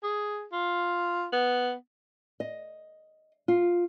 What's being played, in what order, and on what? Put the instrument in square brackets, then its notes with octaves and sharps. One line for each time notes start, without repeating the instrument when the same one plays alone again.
[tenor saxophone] G#4
F4
B3
[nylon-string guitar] D#5
F4